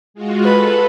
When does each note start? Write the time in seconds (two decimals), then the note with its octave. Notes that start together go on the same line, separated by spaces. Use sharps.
0.14 G#3 F4 F#4
0.45 A4 B4